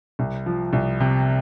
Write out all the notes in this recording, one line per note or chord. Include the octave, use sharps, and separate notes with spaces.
C2
F3
C2
C3